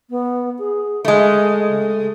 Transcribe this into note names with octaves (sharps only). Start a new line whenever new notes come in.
B3
G#4
G#3 A3 D#5
C#3